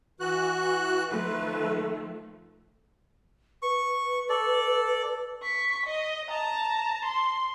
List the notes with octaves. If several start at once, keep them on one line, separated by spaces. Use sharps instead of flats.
E3 F#4 F#6
D#3 F3 A3 B4
B4 C#6
A4 D5
C#6 B6
D#5
A5 A#5
C6